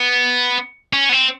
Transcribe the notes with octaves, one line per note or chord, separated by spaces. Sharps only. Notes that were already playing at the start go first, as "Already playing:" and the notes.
Already playing: B3
C#4
B3
C4